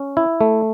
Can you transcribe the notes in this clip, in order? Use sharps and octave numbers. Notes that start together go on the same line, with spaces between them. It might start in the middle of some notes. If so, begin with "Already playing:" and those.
Already playing: C#4
E4
A3